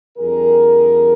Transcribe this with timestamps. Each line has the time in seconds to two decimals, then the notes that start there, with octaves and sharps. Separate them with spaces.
0.18 F2 D3 G3 G#4 A#4